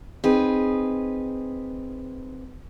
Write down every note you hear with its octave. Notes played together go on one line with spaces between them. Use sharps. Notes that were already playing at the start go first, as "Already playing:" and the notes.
C4 D#4 G#4 B4